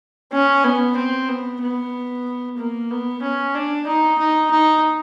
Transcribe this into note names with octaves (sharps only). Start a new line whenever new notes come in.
C#4
B3
C4
B3
B3
A#3
B3
C#4
D4
D#4
D#4
D#4